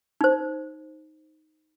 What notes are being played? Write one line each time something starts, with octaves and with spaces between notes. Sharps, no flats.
D#4 C5